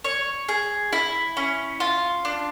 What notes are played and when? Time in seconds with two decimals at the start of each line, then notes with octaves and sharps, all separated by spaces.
0.04 C#5
0.49 G#4
0.93 E4
1.37 C#4
1.80 F4
2.25 D4